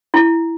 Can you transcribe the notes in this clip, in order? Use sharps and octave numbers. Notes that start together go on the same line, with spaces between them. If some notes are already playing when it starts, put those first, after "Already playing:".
E4